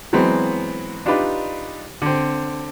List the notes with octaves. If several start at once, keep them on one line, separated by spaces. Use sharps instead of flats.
E3 F#3 G#3 B3 C4
D4 D#4 F4 G4 B4 D5
D3 C4